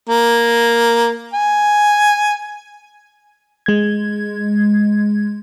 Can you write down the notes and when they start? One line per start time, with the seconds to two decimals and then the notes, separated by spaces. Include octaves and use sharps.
0.09 A#3
1.34 G#5
3.66 G#3 G#6